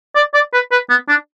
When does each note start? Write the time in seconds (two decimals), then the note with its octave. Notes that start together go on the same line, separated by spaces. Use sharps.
0.15 D5
0.34 D5
0.53 B4
0.72 B4
0.90 B3
1.09 D4